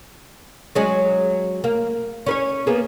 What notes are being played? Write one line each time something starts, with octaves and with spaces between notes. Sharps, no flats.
F#3 G#3 C#4
A#3
C#4 B4 C#5
A#3 B3 G#4